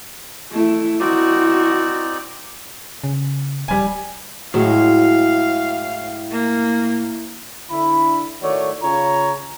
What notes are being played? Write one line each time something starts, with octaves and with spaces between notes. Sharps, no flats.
A3 E4
C4 D#4 E4 F#4 D5
C#3
D#1 G3 G#5
A2 F#3 G#3 F5
A#3
D3 E4 B5
A2 D#3 A3 F#4 C#5 D5
C#3 F4 C#5 A#5